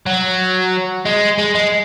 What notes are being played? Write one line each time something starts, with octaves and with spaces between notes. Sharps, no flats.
F#3
G#3
G#3
G#3